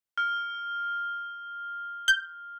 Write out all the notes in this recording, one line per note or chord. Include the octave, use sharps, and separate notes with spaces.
F6
G6